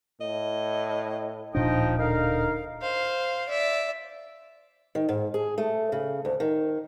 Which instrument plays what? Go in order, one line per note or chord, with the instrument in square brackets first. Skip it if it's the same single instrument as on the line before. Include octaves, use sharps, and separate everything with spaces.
[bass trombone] A2 [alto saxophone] D#5
[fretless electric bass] D1 A#2 D4 [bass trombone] F3 [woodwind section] D#4 D#5 G5
[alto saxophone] D3 [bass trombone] D#4 [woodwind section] A#4 F5
[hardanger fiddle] C5 F5
D5 E5
[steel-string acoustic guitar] D#3
G#2
G#4
A3
C#3
D2
D#3